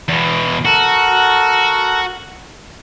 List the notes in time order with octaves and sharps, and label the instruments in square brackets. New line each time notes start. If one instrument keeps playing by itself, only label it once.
[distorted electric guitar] E2 B2
[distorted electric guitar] F#4 [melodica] A4 A#4 F#5